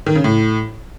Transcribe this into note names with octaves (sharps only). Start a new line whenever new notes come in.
D#3
C#3
A2